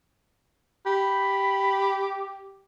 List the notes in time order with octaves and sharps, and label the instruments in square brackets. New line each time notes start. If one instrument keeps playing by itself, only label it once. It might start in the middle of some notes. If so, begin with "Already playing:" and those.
[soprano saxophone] G4 [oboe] B5